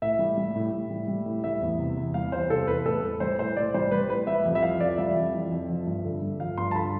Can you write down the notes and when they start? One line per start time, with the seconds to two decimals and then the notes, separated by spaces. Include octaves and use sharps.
0.02 A2 E5
0.19 G3
0.38 G3
0.56 A2
0.73 A2
0.91 G3
1.08 G3
1.26 A2
1.44 G3 E5
1.61 E2
1.79 C3
1.97 E2
2.14 G3 F5
2.32 E2 C5
2.50 C3 A4
2.67 E2 B4
2.85 A2 A4
3.03 G3
3.20 G3 C5
3.38 A2 C5
3.57 A2 D5
3.74 G3 C5
3.91 G3 B4
4.10 A2 B4
4.27 G3 E5
4.45 F2
4.55 E5
4.63 E3 F5
4.80 F2 D5
4.98 G3 E5
5.16 F2
5.34 E3
5.51 F2
5.69 F3
5.87 G2
6.05 D3
6.22 G2
6.40 F3 F5
6.58 G2 C6
6.71 A5
6.75 D3 B5